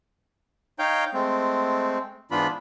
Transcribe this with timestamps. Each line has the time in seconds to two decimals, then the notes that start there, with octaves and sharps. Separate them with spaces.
0.79 D#4 C#5 F5 G5 G6
1.14 G#3 A3 C4
2.31 G#2 E3 B3 D4 F4 B5